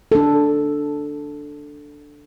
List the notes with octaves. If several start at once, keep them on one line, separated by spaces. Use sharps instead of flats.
D4 A4